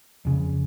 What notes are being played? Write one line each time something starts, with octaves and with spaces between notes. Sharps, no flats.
F2 C#3